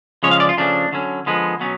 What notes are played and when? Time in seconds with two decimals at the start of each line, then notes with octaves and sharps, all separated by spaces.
0.23 C#3 F3 G#3 C#4 C#5
0.31 F5
0.40 D5
0.49 F4
0.58 C#3 F3 A3 C#4 D4
0.92 D3 F#3 C#4
1.26 D3 F3 G#3 B3
1.60 B2 F#3 B3 C#4